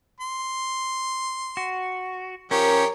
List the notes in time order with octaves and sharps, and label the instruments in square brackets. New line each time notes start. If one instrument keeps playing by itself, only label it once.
[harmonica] C6
[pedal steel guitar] F#4
[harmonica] F3 G4 C#5 [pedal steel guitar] C#4 [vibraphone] A#4 A#5